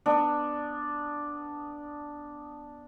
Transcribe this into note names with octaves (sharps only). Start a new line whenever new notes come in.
B3 D4